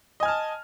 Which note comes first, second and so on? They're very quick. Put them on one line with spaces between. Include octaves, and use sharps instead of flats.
D#5 G#5 F6 A5